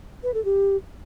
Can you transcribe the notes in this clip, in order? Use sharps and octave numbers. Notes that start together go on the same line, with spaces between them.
B4
A4
G4